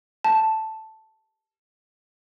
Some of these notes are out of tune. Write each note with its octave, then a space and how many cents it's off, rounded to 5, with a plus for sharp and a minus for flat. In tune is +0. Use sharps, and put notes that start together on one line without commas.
A5 +0